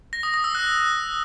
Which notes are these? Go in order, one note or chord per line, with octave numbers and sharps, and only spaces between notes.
A#6
D#6
D#6
E6
F#6